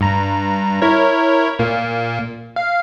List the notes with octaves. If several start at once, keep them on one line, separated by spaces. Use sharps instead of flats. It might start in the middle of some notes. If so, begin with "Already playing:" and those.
G2 A#5
E4 A#4 C#5
A#2 A#3
F5